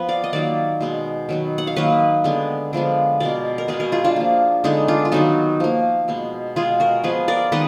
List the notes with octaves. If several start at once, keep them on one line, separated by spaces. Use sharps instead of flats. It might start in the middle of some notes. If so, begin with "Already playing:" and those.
Already playing: F3 B3 B4
D5 F5
D#5
D#3 F#3 A#3 D5 F5
B2 G#3 B3
D#3 F#3 B3
F#5
F5
D#3 F#3 A#3 B4 D#5
D3 G#3 B3
D3 F3 G#3 B3
B2 G#3 B3 A#4 D5
A#4
B2 G#3 B3 G#4 B4
F#4 A#4
F4 G#4
D4 F4
F3 A#3
D3 G#3 B3 D#4
D4 F4
F4
D#3 F#3 B3 D#4 F#4
F3 A#3
B2 G#3 B3
B2 G#3 B3 F4 G#4
F#4 A#4
F3 B3 G#4 B4
A#4 D5
D#3 G#3 B3 B4 D#5